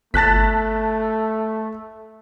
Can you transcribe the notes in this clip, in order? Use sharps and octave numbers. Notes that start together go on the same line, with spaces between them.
G1 A3 A5 F#6 A6 B6